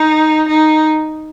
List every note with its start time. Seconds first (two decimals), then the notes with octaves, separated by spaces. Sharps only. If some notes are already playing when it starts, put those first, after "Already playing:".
Already playing: D#4
0.49 D#4